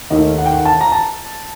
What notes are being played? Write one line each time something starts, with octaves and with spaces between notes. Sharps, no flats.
D#2 D#3 A3 D#5
F#5
G5
F#5
A5
A#5
A5